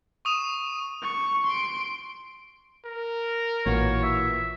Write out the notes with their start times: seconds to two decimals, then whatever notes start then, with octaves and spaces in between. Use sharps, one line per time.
0.25 C#6 D#6 D#7 E7
1.02 C#6
1.47 C6 D7
2.85 A#4
3.66 A1 A#2 E3 F#4 C#5
4.03 E5